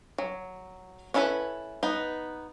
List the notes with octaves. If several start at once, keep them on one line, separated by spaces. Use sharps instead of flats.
F#3
C#4 D4 E4 A4 B4
B3 D#4